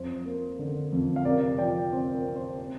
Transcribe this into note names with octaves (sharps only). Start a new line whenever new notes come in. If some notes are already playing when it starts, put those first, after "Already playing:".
Already playing: F2 C5
A#3
D3
F2
F5
C3 A#4 D5
F3 D5 G5
C4 C5
A#4
C4
C5
C4